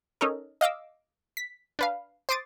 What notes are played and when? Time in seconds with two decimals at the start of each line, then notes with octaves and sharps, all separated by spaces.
0.21 C#4 D#4 A4 A#4
0.61 D#5 F5 D6 E6
1.37 B6
1.79 D4 B4 F5
2.29 C5 C6 D6 D#6 A6